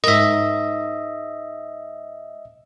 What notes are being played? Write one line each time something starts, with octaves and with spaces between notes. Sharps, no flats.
G#2 A#4 D#5 E5